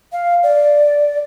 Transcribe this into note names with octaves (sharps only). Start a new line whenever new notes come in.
F5
D5